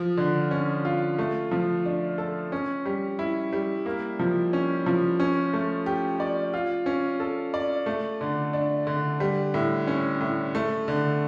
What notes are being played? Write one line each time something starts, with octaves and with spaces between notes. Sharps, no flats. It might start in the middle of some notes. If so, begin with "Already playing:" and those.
Already playing: F3
D3
C#4
F4
A3
F3
D4
A4
C#4
G3
E4
G3
A#3
F3
C#4
F3
C#4
A3
G4
D5
F4
C#4
A4
D5
A3
D3
D4
D3
G3
A2
C#4
A2
A3
D3